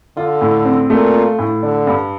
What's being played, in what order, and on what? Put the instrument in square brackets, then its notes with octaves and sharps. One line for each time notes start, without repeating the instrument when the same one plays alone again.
[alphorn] D3 [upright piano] F4
[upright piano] A2
C4
[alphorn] A#2 [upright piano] A3
[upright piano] F4
A2
[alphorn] D3 [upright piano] D4
[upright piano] G2